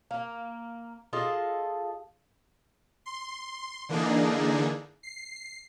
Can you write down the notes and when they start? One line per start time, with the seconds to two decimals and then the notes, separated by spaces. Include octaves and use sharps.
0.11 A#3
1.13 F4 G#4 A4 D#5
3.06 C6
3.89 D3 E3 A#3 D4 D#4 G#4
5.03 C7